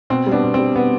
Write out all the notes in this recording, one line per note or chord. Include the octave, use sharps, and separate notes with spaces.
B2 C4
G3
B3 D4
B2
G3 C4
B2 B3